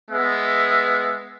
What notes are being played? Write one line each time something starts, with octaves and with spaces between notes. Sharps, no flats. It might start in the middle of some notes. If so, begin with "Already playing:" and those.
G#3 B3 E5